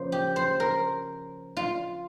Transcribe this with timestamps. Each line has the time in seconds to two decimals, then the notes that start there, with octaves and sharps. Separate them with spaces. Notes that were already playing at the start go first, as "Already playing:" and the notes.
Already playing: C#3 F3 A#3 C5
0.12 G4
0.36 C5
0.60 A#4
1.57 F4